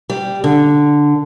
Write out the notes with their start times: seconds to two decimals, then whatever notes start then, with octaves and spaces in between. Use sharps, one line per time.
0.10 G3
0.44 D3